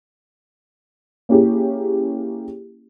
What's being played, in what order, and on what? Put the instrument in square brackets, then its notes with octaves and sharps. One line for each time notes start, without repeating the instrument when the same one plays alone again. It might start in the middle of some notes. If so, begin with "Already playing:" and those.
[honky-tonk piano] A#3 C#4 E4 G4 G#4